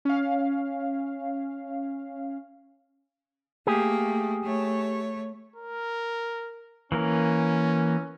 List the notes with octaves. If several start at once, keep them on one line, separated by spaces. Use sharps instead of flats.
C#4 F5
A3 A#3 G4 G#4
A3 C#5
A#4
E3 A#3 C#4 A#4